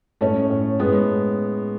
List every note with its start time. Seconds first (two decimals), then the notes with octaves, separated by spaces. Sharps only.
0.21 A2 A3 C#4
0.50 A2
0.79 A2 G#3 B3